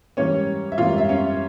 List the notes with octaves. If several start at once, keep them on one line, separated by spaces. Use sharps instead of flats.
G#2 E3 G3 A#3 C#4 C#5
E5
G#2 E3 G3 A#3 C#4 F4 F5
E5
C#4 C#5